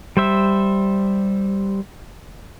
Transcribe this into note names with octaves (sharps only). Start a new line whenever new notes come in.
G3 C5 E5